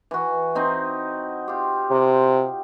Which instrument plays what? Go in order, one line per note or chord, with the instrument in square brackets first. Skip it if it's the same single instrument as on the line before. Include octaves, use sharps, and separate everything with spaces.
[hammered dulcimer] E3 F#4
C4 D#4
F4 G4
[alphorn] C3